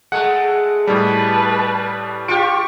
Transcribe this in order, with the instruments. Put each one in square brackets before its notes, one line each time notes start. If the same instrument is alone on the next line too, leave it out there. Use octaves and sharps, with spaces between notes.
[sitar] G#3 A3 [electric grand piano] F#5
[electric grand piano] A2 G3 [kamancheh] B4 A5
[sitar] F4 G4 [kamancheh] C#6 [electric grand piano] D7